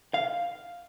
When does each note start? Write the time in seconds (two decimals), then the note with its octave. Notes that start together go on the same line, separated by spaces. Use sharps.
0.14 F5